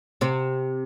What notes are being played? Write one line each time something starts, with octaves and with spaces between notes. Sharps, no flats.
C3 C4